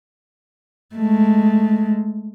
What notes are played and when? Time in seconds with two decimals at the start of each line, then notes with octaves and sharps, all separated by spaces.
0.96 G#3 A3